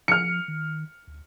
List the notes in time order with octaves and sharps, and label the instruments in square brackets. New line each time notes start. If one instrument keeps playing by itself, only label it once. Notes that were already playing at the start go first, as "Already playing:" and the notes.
[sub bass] F3 [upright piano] F6 C#7
[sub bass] D#3
D2